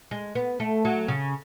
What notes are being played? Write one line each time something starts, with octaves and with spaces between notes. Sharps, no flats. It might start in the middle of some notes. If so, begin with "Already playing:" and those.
G#3
B3
A3
F#3
C#3